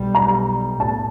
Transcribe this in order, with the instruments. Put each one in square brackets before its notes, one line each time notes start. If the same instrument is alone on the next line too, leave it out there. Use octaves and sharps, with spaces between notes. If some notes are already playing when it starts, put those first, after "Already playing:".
Already playing: [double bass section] B1 B2 G3
[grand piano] A#5
[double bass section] B1 A2 [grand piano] A5